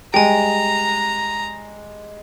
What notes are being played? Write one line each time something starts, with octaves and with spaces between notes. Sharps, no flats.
G3 G#3 G5 G#5 A#5